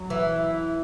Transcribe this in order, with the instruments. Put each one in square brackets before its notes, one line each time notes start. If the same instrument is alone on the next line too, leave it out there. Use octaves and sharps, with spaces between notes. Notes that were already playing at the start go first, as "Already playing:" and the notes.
Already playing: [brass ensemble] F#3
[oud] E3